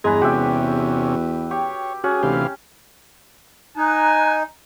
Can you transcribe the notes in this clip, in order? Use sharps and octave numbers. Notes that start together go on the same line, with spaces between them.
E2 G2 G#3 G#4 B4 A#5
C3 C#4 F#4 G4 E5
G4 C#5
C#4 F#4 G#4
D2 C3 E3 G4 F5
D#4 G#5 A#5 F#6